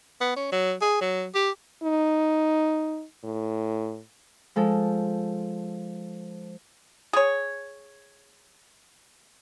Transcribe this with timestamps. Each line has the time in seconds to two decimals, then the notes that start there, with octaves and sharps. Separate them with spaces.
0.21 B3
0.36 C#4
0.52 F#3
0.81 G#4
1.01 F#3
1.35 G4
1.83 D#4
3.24 A2
4.56 F3 G#3 A4
7.13 G#4 C#5